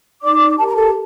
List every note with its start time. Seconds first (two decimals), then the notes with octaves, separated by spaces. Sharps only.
0.23 D#4 D5 D6
0.58 G4 A#4 A5
0.67 A#5
0.76 A4 A5